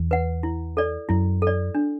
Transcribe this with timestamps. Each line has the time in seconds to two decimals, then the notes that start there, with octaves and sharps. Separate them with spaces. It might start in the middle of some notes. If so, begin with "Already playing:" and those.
Already playing: E2
0.11 B4 F#5
0.43 E4
0.77 A4 D5
1.09 F#2 E4
1.42 A4 D5
1.75 D4